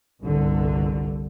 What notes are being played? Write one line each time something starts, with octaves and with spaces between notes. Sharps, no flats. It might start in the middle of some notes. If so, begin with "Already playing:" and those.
G1 C2 D3